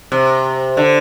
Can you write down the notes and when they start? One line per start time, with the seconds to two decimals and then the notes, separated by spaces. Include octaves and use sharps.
0.12 C3
0.77 D3